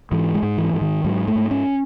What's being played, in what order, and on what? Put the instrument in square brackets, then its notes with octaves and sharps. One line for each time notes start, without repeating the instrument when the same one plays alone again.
[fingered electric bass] G#2 E3
G#3
G#2
E3
G#2
D#3
G#2 F#3
A3
G#2
C#4